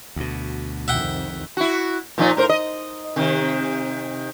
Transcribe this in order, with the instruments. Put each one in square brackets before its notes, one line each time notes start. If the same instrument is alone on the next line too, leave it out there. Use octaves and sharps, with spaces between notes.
[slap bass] D2 B2
[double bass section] C2 F2 D#3 [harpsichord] E5 F#5 G5
[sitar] E4 F#4
A#2 F3 D#4
A2 A#4 C5
D#5
C3 D#3